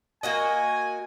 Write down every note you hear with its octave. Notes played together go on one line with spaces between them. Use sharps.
A#3 F#4 D#5 G#5